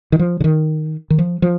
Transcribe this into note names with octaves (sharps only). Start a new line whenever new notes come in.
D#3
F3
D3
D#3
D#3
F3
F3